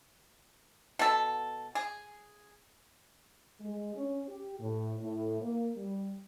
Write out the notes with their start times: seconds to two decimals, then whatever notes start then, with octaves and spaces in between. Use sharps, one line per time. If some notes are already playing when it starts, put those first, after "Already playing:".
0.99 B2 A4
1.75 G#4
3.61 G#3
3.95 C#4
4.29 G4
4.60 A2
5.00 A2
5.42 A#3
5.76 G3